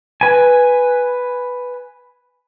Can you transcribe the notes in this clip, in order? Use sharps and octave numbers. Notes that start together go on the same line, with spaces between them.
B4 G#5